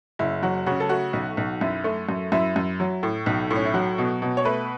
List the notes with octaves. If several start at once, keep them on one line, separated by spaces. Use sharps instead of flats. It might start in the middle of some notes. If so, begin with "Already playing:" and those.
F#1 E4
F#3 F#4
C#3 F#4
A4
A3 F#4
B1
B1
F#2 E4
A3
F#2
F#2 E4
F#2
F#3
A2
B1
A2
C#4
E4
F#3 F#4
B2
B2
C#5
A3 B4